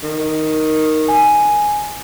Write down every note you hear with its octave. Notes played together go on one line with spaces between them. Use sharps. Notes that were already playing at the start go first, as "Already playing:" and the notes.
D#3
G#5